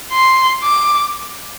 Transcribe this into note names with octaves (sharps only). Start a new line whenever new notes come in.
C6
D6